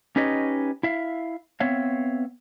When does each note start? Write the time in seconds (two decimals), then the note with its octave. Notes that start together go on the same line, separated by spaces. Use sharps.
0.16 C#4 D#4 G4 B4 C#5 D#5
0.83 E4 E5 F5
1.60 B3 C4 C#5 E5 F5